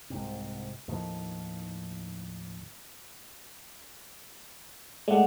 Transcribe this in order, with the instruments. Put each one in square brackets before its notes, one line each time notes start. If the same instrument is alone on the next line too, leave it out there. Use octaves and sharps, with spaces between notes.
[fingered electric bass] C2 G#2 C3
D#2 A2 D#3 F3
[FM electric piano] G#3 A3 [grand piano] D5 F#5